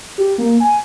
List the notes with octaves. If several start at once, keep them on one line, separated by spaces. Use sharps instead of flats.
G4
A#3
G#5